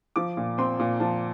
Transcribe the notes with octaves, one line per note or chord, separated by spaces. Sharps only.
F3 D6
A#2
C4 C6
A#2
F3 A5